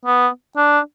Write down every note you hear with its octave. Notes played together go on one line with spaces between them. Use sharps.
B3
D4